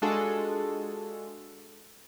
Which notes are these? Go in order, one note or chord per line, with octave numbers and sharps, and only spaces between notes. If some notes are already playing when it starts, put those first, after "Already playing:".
G#3 D4 F4 F#4 G#4 A4